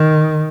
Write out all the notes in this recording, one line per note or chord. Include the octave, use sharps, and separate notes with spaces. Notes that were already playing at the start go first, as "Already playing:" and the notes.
Already playing: D#3